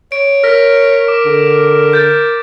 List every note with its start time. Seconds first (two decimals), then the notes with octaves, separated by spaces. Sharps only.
0.12 C#5 D7
0.44 A#4 F6 A#6 B6
1.08 D6
1.26 D3
1.93 G6 A6